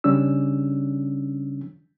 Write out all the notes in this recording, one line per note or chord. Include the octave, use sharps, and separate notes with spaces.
C#3 G3 C#4 D4 E6